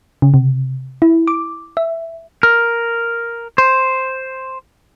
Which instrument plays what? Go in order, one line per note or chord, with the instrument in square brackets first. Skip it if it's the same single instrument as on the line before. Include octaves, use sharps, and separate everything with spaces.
[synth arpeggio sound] C#3
C3
E4
D6
E5
[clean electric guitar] A#4
C5